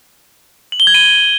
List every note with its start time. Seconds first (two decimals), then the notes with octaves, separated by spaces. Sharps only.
0.72 F#7
0.80 G7
0.87 G#6
0.94 D#7